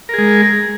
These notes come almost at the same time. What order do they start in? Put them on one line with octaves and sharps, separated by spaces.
A#4 G#4 G#3